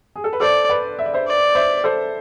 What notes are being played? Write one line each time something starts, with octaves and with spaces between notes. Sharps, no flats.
G#4
A4
B4
A4 C5 D5
B4 D5
E5
D5
C5 E5
D5
C5 E5
A4 C5